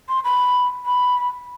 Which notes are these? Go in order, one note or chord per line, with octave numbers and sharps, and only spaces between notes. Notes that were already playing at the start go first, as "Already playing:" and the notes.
C6
B5
B5